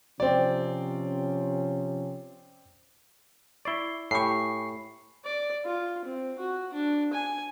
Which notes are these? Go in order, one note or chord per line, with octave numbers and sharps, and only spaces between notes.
C3 F3 C4 C#4 D5
E4 D5 C#6 C7 G7
A2 G4 G#5 B5 C#6 C7
D5
F4
C4
F#4
D4
G#5